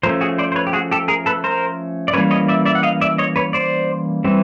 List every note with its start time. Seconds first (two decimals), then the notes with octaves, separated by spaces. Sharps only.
0.03 F3 A3 C#4 A#4 C5
0.21 F#4 G#4
0.39 C5 D5
0.52 C5
0.56 B4 C#5
0.67 G4
0.73 F#4 G#4
0.91 G4 A4
1.08 G#4 A#4
1.26 A4 B4
1.44 A#4 C5
2.08 D5
2.13 E3 G3 A#3 C#4 B4 C#5
2.31 C#5 D#5
2.48 D5 E5
2.66 D5 E5
2.75 F#5
2.83 D#5 F5
3.01 D5 E5
3.18 C#5 D#5
3.36 B4 C#5
3.53 C5 D5
4.24 E3 G3 C4